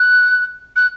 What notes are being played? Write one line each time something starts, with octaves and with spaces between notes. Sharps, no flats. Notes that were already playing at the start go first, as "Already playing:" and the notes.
Already playing: F#6
F#6